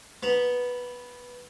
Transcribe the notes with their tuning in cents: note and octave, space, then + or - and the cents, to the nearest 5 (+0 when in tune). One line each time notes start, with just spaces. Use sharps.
B3 -5 A#5 +0